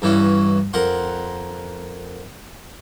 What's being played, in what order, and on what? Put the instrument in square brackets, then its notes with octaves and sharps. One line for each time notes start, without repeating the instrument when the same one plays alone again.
[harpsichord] G2 E3 C#4 F#4
F2 A#4 F#5 C6